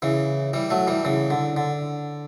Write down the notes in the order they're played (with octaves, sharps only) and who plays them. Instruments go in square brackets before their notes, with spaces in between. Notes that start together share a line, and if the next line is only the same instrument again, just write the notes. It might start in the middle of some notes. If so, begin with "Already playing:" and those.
[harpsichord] C#3 E3
E3 G3
F#3 A3
E3 G3
C#3 E3
D3
D3